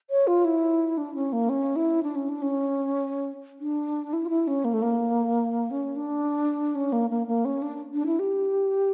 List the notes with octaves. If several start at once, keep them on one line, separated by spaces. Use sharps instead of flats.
C#5
F4
E4
D4
C#4
A#3
C#4
E4
D4
C#4
D4
C#4
D4
E4
F4
E4
C#4
A#3
A3
A#3
C#4
D4
C#4
A#3
A#3
A#3
C#4
D4
D4
E4
G4